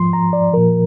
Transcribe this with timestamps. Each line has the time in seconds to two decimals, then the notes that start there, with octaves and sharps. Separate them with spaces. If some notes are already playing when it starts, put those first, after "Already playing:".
Already playing: G#2 F3 C6
0.13 A#5
0.33 D5
0.53 A#2 F3 A#4